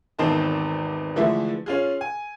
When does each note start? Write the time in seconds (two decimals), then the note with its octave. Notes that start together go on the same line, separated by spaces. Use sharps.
0.19 G#1 E2 D#3 C4 D#5 A5
1.16 D3 E3 F3 G#3 A3 E4
1.66 C#4 F4 G#4
2.01 G#5